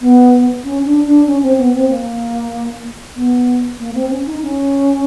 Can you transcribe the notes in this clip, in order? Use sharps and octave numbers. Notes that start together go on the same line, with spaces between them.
B3
C#4
D4
D4
C#4
C4
B3
C4
A#3
B3
A#3
C4
C#4
D#4
C#4